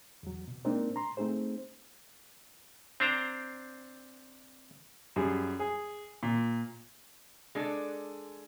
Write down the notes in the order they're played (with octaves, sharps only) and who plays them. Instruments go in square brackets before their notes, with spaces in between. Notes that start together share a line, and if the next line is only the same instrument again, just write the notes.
[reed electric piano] E2 F#3
B2
G#3 A#3 C4 D4 D#4 A#4
A#5 C6
A3 C4 D#4 G#4 C5
[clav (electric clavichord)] C4 D4 C5 A#5
[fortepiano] F#2 G3 G#4
G#4
A#2
[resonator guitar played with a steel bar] G#3 D4 A4